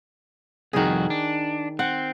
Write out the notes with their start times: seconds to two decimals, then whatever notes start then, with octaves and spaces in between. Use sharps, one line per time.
0.73 C2 F2 D#3 F#4 G#4
1.10 D4
1.79 C4 F#5